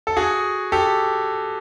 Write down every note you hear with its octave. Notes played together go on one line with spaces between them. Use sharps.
A4
F#4 G#4
G4 A4